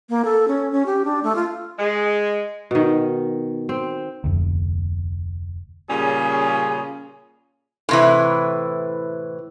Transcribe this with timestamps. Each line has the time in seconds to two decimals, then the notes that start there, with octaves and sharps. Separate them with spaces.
0.09 A#3
0.25 A4
0.48 C#4
0.72 C#4
0.86 G4
1.05 D4
1.23 A3
1.35 F4
1.79 G#3
2.71 B2 D#3
3.69 C4
4.24 F1 D2
5.90 A#2 C#3 G3 C#4 G#4
7.89 A2 C3 E3